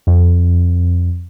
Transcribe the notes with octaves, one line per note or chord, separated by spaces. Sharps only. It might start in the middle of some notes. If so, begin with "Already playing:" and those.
F2